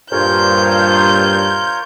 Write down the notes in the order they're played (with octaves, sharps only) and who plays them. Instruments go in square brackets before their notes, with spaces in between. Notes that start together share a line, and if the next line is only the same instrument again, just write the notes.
[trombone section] G2 C5 [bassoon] A#2 [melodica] F4 A#4 C#5 [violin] G6